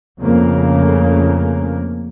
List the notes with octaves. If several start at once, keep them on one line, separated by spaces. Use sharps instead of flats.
F2 C#3 A3 A#3